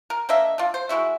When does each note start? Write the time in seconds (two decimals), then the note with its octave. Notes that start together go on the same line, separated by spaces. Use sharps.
0.10 A#4
0.29 A#3 D4 D#5 E5
0.58 D3 F4
0.74 C5
0.89 G#3 E4 F#4 E5